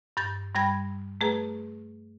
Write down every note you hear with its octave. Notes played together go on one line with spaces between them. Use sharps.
G2 G6 A6
G2 G3 G5 B5 G#6 A#6
A3 G#4 B4 A#5